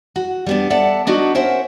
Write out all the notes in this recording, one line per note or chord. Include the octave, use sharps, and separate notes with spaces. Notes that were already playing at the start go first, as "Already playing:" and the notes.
F#4
G3 B3 D4
A4 D5 E5 F#5 A5
B3 D4 D#4 F#4
C#4 A#4 C5 E5 F#5